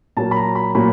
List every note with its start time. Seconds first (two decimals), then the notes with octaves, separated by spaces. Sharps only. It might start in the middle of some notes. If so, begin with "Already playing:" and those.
0.17 A#2 F#3 A#3 A5
0.31 B5
0.36 A#5
0.55 B5
0.75 A#2 F#3 A#3 B5